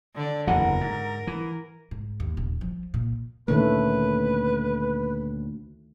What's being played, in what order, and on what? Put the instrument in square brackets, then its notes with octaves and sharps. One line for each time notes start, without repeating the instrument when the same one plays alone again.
[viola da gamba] D3 D5
[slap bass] F#1 E2 E3 [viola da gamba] A#4 [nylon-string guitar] F#5
[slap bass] G#2
E3
[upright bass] G#2
D#2
D#1
F3
A#2
[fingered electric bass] D2 A#2 C#4 [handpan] D#3 A3 [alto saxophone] B4